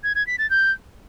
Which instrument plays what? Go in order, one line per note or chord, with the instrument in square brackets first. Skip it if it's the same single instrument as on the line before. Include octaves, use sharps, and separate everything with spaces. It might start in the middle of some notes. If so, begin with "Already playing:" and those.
[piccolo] G#6
G#6
B6
A6
G6